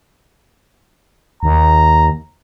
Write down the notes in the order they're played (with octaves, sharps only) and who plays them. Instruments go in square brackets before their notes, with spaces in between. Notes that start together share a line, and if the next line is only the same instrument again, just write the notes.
[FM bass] D#2 [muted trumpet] A#5